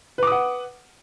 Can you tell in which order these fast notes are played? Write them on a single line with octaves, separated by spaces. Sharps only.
B4 D6 D#6 F#5